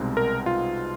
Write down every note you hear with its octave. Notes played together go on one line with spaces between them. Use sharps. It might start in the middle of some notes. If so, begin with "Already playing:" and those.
Already playing: C2 B2 G#3 C4 D#4
A#4
F4